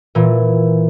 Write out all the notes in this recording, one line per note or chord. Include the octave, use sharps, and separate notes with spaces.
A#2 E3